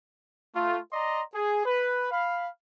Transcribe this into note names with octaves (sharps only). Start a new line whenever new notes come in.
A3 F4
D5 D#5 A#5 C6
G#4
B4
F5 B5